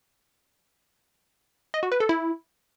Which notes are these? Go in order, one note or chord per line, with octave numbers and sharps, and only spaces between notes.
D#5
F#4
B4
A4
E4